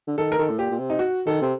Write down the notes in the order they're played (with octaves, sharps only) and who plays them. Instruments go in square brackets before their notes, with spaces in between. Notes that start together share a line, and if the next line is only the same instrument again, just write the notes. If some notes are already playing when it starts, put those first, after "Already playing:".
[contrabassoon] D3
[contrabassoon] D#3 [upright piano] A4
[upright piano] A#4
[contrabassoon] D#3 [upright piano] A4
[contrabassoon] A2
[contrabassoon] A#2 [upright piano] G4
[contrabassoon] A#2
C3
[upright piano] D#4
F#4
[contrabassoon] D#3 [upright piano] A4
[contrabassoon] C3